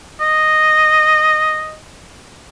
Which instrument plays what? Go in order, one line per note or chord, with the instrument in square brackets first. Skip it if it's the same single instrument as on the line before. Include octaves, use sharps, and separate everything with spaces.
[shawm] D#5